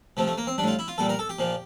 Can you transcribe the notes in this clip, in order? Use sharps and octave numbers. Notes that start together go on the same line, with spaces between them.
C3 F3 A3
A3
A#3
C4
A2 G3 D4 F4
E4
F4
A#2 G3 A4
A#4
A4
G4
A#2 F3